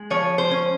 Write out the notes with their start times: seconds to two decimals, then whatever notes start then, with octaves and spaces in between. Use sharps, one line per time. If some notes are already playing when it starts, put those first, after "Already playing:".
Already playing: G#3
0.10 F3 C#5
0.38 C5
0.51 C#4